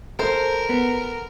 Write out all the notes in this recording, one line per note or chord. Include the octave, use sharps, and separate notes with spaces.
A4 A#4 C5
B3